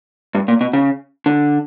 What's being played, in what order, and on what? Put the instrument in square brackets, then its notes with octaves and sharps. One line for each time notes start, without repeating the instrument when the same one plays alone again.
[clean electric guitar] G2
A#2
B2
C#3
D3